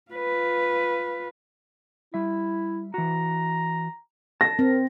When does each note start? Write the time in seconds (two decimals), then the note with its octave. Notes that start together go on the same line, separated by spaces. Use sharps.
0.11 F4 B4
2.14 G3 E4 E5
2.94 E3 F#4 A#5
4.41 A5 A#6
4.59 C4 A#4